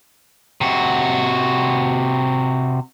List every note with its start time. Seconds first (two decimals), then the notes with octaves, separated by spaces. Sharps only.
0.61 C3 F#4